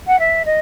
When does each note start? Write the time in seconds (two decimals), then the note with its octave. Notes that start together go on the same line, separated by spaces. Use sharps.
0.07 F#5
0.19 E5
0.45 D#5